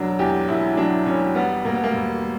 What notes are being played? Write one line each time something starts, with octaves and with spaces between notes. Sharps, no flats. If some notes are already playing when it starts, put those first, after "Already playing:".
Already playing: E1 F#3 D4
E2 G4
E1 E4
F#3 D4
E1 C#4
G3 B3
E1 A#3
B3
A#3
E1